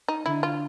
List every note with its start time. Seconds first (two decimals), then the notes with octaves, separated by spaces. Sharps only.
0.08 D#4
0.26 D3 E4
0.43 F4